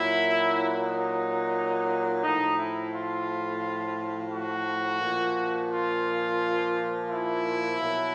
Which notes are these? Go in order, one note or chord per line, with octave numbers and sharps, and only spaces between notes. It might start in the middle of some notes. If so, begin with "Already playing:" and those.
Already playing: A#2 F#3 E4
D#4
A2 F3 D#4
E4
F4
F#4
A#2
F3
F4
E4
B2 F#3